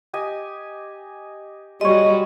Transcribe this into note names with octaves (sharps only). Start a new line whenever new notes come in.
G4 D#5 G#5
G3 G#3 F#4 C#5 D#5